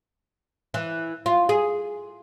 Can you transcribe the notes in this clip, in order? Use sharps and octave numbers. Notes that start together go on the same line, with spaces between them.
E3
F4
G#4